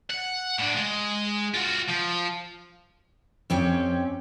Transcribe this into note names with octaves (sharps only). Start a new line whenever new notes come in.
F#5
A2 D4
G#3
F4 F#4
F3
F2 C4 C#4 G4